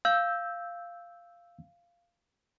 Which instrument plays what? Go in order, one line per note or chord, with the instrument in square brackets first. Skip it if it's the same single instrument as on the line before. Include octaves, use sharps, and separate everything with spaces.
[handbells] F5 [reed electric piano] E6 G6